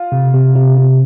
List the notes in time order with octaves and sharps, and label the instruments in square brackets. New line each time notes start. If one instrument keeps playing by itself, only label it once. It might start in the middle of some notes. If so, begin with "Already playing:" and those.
Already playing: [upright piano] F4
[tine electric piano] C3
C3
C3
C3